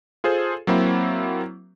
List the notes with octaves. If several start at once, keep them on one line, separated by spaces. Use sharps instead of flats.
F4 G#4 A4 C5
F#3 A#3 C4 E4